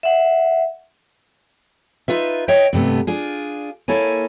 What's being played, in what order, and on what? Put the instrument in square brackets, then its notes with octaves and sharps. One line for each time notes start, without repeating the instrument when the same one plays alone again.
[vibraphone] E5 F#5
[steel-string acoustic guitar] D#4 F4 B4 E5
C#5 D#5 E5 G5
G2 C3 A3 B3
D4 F4 G#4
A#3 E4 A4 C#5 G#5